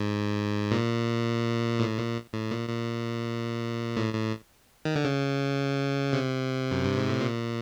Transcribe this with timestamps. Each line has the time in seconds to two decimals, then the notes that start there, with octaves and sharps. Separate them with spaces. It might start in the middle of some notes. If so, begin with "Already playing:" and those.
Already playing: G#2
0.71 A#2
1.80 A2
1.98 A#2
2.33 A2
2.51 A#2
2.69 A#2
3.97 A2
4.13 A2
4.85 D#3
4.95 D3
5.05 C#3
6.13 C3
6.72 F#2
6.84 G2
6.97 G#2
7.09 A2
7.21 A#2